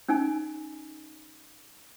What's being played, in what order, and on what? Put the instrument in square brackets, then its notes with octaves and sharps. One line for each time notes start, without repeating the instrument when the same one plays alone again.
[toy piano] C#4 D#4 G#5